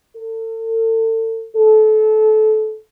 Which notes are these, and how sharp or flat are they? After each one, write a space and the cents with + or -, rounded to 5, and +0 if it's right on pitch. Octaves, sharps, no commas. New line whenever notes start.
A4 +35
A4 -25